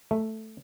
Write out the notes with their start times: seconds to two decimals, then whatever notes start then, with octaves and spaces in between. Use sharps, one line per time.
0.11 A3